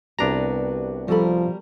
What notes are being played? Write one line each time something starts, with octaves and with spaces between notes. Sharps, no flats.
C2 B3 D4 F#4 G4 A#5
F3 G3 F#4 A4 A#4 B5